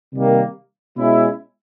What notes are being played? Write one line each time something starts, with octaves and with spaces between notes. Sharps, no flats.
C3 D#3 G3 A#3
B2 G#3 C#4 E4